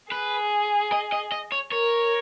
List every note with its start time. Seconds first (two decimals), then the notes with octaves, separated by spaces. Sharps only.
0.12 G#4 B4
0.92 D#5
1.12 D#5
1.32 D#5
1.52 C#5
1.72 A#4 C#5